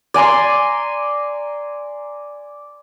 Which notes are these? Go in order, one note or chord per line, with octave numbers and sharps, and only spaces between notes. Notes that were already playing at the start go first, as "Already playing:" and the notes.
D5 G#5 A#5 C6